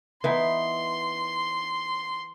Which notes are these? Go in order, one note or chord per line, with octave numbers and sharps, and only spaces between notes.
E3 B3 D#4 C6